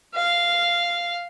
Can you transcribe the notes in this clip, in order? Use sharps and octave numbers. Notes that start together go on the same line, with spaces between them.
F5